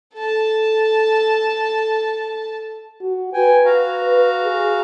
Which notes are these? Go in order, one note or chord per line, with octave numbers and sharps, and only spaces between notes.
A4 A5
F#4
B4 G5 G#5
F#4 F5 A#5
B4
G#4